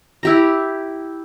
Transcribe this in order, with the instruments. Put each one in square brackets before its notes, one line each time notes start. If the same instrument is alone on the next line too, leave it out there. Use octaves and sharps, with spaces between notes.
[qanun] E4 G4 A#5